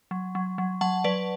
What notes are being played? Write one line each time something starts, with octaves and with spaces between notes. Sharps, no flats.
F#3
F#3
F#3
F#3 F#5 A5
F#3 B4 D5